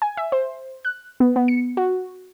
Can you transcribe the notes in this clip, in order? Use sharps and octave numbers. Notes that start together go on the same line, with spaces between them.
G#5
E5
C5
F#6
B3
B3
C#7
F#4